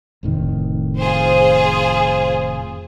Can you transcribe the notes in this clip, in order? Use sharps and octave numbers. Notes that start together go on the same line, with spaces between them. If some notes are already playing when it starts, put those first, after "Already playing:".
F1 A2 D#3
F4 G#4 C5